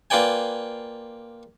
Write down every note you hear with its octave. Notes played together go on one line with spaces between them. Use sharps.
A#3 F4 B4 D5 G5 G#5